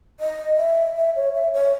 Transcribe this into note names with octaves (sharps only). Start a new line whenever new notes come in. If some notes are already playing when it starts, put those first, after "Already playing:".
D#5
E5
E5
C#5
E5
C#5